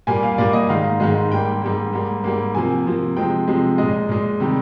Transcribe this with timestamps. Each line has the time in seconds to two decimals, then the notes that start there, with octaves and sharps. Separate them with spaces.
0.07 A#2 G3 A#3 G#5
0.23 F5
0.38 A#2 G3 A#3 D5
0.53 D#5
0.69 G#2 D#3 G#3 F5
1.00 G#2 D#3 G#3
1.31 G#2 G3 A#3 G5
1.62 G#2 G3 A#3
1.93 G#2 G3 A#3
2.24 G#2 G3 A#3
2.55 C3 F3 A#3 G#5
2.86 C3 F3 A#3
3.16 C3 F3 G#3 G5
3.47 C3 F3 G#3
3.78 A#2 G#3 D#5
4.09 A#2 G#3
4.40 C3 D#3 G3